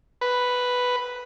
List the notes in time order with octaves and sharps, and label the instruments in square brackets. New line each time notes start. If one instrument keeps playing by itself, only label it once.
[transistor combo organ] B4